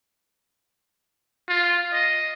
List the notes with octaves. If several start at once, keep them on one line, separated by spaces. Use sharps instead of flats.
F4
D#5